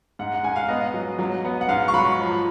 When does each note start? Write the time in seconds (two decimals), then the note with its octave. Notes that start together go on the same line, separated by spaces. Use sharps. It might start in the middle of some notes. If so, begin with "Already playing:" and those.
0.19 G#2 F#5
0.34 F#5
0.44 G#2 G#5
0.56 F5
0.68 B3 D#5
0.94 F#3
1.19 F#3
1.45 B3
1.61 F#5
1.68 G#2 F5
1.88 C#6
1.93 F#3 B5
2.19 F3